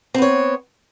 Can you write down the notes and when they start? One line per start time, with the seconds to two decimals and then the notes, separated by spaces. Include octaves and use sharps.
0.14 C4
0.18 B3
0.22 C#5